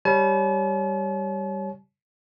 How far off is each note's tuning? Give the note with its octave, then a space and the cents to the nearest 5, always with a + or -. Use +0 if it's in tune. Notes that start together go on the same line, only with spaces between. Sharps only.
G3 +0 C#5 -10 A5 -45